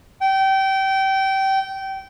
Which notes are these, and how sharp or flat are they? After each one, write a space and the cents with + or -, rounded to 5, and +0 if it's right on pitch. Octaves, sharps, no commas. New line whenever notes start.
G5 -25